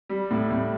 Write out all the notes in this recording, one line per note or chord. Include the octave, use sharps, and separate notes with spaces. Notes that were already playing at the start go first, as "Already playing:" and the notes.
G3
A2
A2